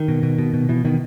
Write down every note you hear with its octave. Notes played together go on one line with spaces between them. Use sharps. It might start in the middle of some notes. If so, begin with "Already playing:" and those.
Already playing: D#3
B2
B2
B2
B2
B2 E3
B2 D#3